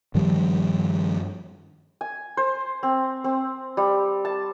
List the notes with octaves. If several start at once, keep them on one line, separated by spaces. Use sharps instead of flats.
G2 D#3 F3 G3
G#5
C5
C4
C4
G3
A5